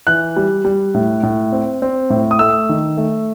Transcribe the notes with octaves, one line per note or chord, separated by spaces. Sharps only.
E3 F#6
G3
G3
A2
A2
C4
C4
A2
D#6
A3 E6
D#3
A3